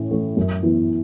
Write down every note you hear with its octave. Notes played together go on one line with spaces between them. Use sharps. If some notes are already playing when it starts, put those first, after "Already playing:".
Already playing: A2 E3 C#4
E3 A3 C#4
F#2
E3 B3 E4